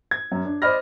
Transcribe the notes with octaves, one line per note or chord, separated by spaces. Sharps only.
G#6
F#2
D4
C5 D5 D#5 B5 F6 A#6